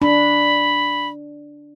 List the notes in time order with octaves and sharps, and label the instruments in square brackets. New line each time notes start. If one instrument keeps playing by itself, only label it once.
[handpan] D4 [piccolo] B5